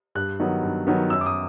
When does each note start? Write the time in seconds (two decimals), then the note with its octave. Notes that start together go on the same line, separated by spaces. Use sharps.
0.15 G2 F#6
0.40 D#3 F#3 B3
0.63 G2
0.87 D#3 F#3 B3
1.10 F#2 E6
1.21 D6
1.26 D#6